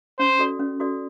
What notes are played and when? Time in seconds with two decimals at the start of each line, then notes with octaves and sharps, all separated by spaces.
0.19 C#4 C5
0.39 F#4 A4 D5
0.60 C#4
0.80 F#4 A4 D5